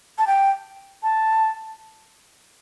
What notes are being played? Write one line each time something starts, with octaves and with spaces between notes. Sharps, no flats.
A5
G5
A5